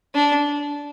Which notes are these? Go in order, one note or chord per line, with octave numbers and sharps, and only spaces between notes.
D4